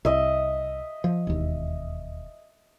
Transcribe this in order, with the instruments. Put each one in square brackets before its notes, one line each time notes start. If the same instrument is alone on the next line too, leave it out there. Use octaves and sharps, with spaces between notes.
[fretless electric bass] C2 [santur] D#5 E5
[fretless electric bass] F3
E1 D#2